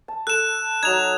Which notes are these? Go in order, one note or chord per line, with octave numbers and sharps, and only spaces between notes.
A5
A4 F#6 E7
F#3 D#4 G#6 F7